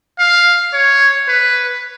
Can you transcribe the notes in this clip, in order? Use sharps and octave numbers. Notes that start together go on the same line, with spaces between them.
F5
C#5
B4